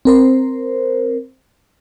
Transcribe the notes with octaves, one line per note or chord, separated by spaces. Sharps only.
C4 A#4 C5